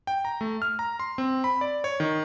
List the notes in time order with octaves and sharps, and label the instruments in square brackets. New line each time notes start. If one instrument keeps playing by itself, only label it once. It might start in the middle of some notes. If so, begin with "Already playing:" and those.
[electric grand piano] G5
A#5
A3
F6
A#5
C6
C4
B5
D5
C#5
D#3